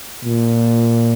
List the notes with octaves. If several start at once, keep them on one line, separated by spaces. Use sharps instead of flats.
A#2